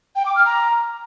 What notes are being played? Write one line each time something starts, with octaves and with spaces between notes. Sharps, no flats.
G5
D6
F6
A#5